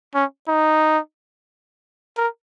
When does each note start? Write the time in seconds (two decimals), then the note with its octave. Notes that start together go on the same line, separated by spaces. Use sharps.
0.14 C#4
0.48 D#4
2.17 A#4